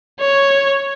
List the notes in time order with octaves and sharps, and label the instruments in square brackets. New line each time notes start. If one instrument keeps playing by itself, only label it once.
[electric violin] C#5